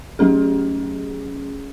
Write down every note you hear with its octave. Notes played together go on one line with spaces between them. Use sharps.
F#3 A3 C#4 G#4